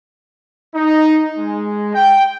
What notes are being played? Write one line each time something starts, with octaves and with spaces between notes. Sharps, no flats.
D#4
G#3
G5